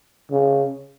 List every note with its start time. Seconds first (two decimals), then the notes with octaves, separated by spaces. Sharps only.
0.31 C#3